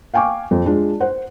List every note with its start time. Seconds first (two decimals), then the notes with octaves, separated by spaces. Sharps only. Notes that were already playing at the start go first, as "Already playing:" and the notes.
0.14 F5 G5 G#5 C#6 D6
0.51 F2
0.66 G#3 D4 F4
1.00 C5 F#5